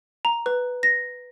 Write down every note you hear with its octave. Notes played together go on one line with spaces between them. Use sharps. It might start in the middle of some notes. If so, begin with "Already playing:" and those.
A#5
B4
A#6